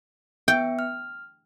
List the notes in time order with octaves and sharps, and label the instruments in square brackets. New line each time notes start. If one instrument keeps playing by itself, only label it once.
[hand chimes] B3 E5 C#7 [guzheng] G5
[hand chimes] F6